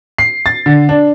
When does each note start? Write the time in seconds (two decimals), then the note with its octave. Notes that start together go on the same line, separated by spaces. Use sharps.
0.18 C7
0.46 A6
0.66 D3
0.89 D4